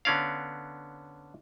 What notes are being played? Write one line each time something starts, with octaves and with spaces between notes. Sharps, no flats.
D3 B3 C#4 D5 F5